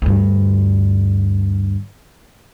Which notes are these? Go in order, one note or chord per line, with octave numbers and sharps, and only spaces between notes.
D2 G2